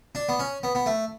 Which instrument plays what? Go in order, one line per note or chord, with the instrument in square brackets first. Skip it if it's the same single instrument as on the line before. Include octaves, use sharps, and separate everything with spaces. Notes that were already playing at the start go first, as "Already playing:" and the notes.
[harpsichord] D4
B3
C#4
B3
B3
A3